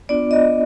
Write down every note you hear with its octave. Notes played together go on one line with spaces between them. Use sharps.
B3 D4 F4 D5
D#5